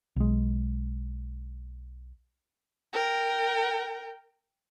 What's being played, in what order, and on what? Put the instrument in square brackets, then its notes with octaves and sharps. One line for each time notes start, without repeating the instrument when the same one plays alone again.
[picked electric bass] B1 G#3
[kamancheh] A#4 G5